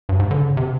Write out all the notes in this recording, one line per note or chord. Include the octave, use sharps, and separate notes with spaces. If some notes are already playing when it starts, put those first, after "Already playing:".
G2
G#2
D3
C#3
C3